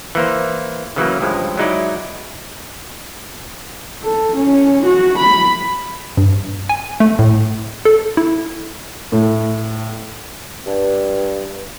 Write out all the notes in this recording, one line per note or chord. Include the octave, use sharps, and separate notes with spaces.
E3 A#3 C5
C#3 E3 F#3 A#3
C#2 G2 F3 G#3
F#3 G#3 D#4 E4 D5
A4
C#4
F#4
B5
G2
G#5
A3
A2
A4
E4
A2
G2